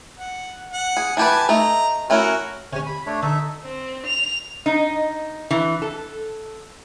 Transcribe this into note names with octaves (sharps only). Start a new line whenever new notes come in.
F#5
F#5
G#4
E3 G4 B4 G#5 A5
A3 D#4 A#5
A3 C#4 E4 F#4 A#4
C3 C#4 C#5 G#5
B5
A3 D4 C#5
D3 D#4 A4 E5
C4
F7
D#4
E3
A4